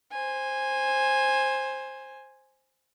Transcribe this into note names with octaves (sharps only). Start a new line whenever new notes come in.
C5 G#5